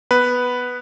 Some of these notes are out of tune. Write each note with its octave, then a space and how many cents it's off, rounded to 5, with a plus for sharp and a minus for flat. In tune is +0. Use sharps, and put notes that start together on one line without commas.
B3 +0 B4 +0